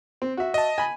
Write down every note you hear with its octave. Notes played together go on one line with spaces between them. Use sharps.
C4
F#4 E5
D#5 A5
G#5 B5